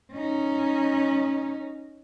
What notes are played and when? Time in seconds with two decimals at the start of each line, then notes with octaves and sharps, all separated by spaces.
0.13 C#4 D#4